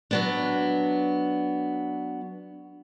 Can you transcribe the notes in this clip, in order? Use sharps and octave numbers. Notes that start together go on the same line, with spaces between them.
F#3 B3 D4